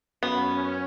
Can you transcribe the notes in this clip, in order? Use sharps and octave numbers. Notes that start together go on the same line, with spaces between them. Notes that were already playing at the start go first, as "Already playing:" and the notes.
F#2 B3 C#4